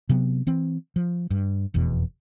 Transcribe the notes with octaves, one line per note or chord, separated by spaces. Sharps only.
C3 F#3 B3
E3 C4
F3
G2
F1 E2 B2